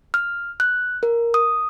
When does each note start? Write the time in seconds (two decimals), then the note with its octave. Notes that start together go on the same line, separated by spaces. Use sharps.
0.14 F6
0.60 F#6
1.03 A#4
1.34 D#6